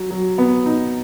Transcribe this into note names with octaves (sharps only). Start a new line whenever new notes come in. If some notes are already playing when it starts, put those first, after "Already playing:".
Already playing: F#3
F#3
B3
D#4